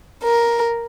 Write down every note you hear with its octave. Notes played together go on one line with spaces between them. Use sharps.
A#4